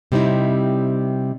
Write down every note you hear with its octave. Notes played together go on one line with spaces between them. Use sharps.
C3 G3 C4 D#4 E4